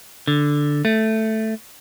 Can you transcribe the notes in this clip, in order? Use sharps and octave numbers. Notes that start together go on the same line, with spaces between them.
D3
A3